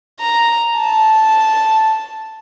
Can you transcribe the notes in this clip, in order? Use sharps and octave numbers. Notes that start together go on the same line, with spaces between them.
A#5
A5